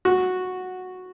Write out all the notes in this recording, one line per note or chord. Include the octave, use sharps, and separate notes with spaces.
F#4